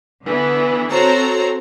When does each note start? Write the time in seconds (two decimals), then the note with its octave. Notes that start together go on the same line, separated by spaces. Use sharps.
0.25 D3 E3 B3
0.91 C4 F#4 A4 C5 C#5 A#5